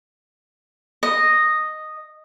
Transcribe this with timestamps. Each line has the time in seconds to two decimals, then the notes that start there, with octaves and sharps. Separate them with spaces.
1.03 D#5